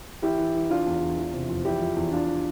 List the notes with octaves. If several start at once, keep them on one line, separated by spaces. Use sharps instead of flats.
E3 E4 G4
E3
E3
E3 D4 F4
E2
E2
E3
C3
F2
E2 E4 G4
F3
E2
F3 D4 F4